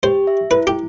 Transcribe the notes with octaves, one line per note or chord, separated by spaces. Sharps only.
G4 C5
E5
E4 B4
G4